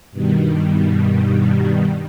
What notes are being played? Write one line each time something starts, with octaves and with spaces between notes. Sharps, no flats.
G2 B2 D#3 G3